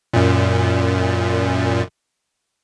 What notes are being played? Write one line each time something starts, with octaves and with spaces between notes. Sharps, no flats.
F#2 A#2